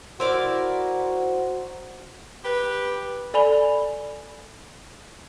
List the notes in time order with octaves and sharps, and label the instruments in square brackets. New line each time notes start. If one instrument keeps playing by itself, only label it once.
[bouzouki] E4 A#4 D5 [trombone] F#4 [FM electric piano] C5
[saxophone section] G4 B4
[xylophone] A4 D5 G#5 B5 F7 G7